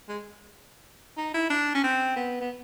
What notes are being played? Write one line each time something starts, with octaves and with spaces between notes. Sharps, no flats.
G#3
D#4
E4
D4
C#4
C4
B3
B3